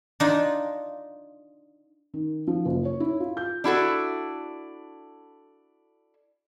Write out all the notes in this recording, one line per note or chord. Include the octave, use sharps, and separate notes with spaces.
D4 D#4 F4
D#3
F3
F#1
C#5
E4
F4
G6
D4 E4 F#4 A4